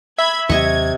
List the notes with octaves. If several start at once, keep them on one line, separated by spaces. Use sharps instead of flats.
E5 B5 G#6
D#2 C3 F#3 D#5 C#6 G#6